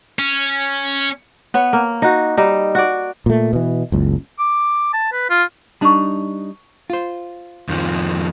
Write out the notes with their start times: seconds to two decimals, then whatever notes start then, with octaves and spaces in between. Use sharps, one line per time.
0.19 C#4
1.54 B3 C#5
1.73 A#3
2.02 D#4 F#4
2.37 G3 D#4
2.75 F#4 D5
3.26 A#2 A3
3.53 B2 E3
3.92 F#1 C#2
4.39 D6
4.94 A5
5.13 B4
5.30 F4
5.81 G3 D4 D#4 A5 C#6
6.90 F4 C5
7.69 F2 D#3 F3